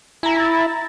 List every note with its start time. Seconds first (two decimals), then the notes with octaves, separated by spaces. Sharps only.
0.23 E4 G#5 A#5
0.37 A#5 A6